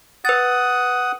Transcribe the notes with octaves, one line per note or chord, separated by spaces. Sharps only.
B4 F#5 D#6 A6